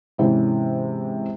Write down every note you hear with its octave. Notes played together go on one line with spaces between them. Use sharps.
G#2 C3 E3 C#4